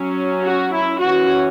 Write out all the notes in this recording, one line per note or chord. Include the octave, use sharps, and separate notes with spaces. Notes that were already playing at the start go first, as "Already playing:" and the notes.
Already playing: F#3 C#4
F#4
E4
E3 C#4 F#4